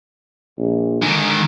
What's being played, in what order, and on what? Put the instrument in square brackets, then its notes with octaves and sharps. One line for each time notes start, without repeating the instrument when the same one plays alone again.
[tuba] A#1
[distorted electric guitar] G#2 D#3 [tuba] D3